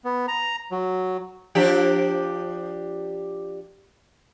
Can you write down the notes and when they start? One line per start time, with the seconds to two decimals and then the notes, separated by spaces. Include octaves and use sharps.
0.04 B3
0.28 A#5
0.71 F#3
1.55 F3 D4 G4